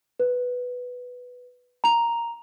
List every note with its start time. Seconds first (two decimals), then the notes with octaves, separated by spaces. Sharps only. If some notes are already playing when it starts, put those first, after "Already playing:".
0.20 B4
1.84 A#5 F7